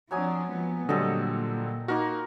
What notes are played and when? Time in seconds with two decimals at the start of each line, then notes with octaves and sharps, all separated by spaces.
0.11 F3 F#3 C4 D4 G#5 D#6
0.49 F3 G#3 B3
0.89 A#2 D3 F#3 G3 C4 A4 D#5
1.88 A#3 D#4 F4 F#4 A#4